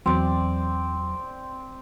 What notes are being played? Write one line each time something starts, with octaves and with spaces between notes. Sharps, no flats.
E2 F#3 C4 D5